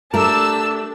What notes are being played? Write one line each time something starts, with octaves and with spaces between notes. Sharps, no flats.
A3 D4 G4 A#4 A5 E6